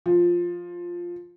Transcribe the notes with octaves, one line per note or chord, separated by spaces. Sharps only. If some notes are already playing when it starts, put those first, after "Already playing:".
F3